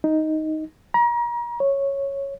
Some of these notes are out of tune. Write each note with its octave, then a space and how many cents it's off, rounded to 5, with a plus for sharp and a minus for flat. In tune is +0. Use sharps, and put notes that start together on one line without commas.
D#4 +5
A#5 +35
C#5 -5